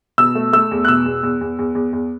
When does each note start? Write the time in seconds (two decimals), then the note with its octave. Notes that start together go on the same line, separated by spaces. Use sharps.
0.18 B2 E6
0.35 A3
0.53 A3 E6
0.71 E2
0.85 F#6
0.88 B2 E6
1.05 E2
1.23 E2
1.41 E2
1.59 E2
1.75 E2
1.93 E2